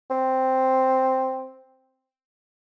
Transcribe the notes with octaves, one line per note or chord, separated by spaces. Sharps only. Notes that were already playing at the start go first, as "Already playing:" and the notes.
C4